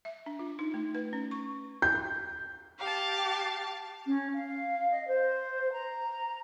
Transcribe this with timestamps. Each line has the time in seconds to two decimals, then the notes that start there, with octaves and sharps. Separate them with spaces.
0.05 E5
0.26 D4
0.39 F4
0.59 D#4
0.74 A3
0.95 B4
1.13 C#4
1.31 C#6
1.82 G6
2.80 G4 F5 A5
4.05 C#4
4.34 F5
4.90 D#5
5.06 C5
5.72 A#5